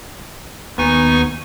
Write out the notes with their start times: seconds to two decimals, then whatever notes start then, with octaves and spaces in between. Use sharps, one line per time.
0.78 D#2 B3 D#4 G#5 C#6